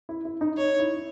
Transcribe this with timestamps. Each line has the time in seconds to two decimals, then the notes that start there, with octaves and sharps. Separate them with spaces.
0.09 E4
0.25 E4
0.41 D#4
0.57 D#4 C#5
0.79 E4